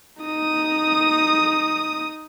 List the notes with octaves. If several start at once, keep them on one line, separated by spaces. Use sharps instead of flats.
D#4 D#6